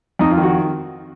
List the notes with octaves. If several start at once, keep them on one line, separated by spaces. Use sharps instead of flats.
F2 D#4
F4
D#3
F#4